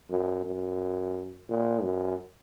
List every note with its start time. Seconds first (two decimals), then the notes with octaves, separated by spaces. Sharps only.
0.10 F#2
0.45 F#2
1.50 A#2
1.83 F#2